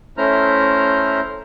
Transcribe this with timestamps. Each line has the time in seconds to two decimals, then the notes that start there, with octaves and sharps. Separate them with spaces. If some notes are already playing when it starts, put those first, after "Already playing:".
0.17 A3 C#4 E4 C5 A#5 F6